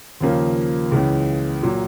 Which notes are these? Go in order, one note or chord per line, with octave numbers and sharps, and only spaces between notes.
D#2 C#3 F3 A#3
C#2 C#3 E3
A#2 F#3